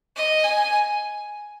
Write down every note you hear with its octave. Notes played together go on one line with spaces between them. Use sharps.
D#5
G#5